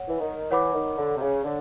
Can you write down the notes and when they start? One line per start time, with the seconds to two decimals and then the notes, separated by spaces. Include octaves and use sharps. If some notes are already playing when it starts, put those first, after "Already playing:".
Already playing: C#5 F#5
0.08 E3
0.20 D#3
0.51 E3 C#5 F#5 B5 D6
0.74 D#3
0.98 D3
1.16 C3
1.21 C#3
1.45 D3 C#5